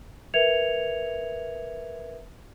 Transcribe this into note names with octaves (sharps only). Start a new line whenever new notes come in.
A#4 B4 E5 G#6 C#7 F7